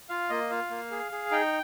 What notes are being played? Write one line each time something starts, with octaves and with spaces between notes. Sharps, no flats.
F4 F5
A#3 D#5
F4 F5
A#3
G#4
G#4
D#4 G5